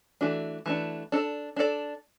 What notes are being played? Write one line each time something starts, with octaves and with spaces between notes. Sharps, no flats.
E3 A3 D4 F#4
E3 A3 D4 F#4
D4 A4 D5
D4 A4 D5